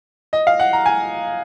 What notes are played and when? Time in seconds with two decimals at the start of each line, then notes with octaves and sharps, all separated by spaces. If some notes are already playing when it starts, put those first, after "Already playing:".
0.33 D#5
0.47 F5
0.59 F#5
0.73 A#5
0.86 G#5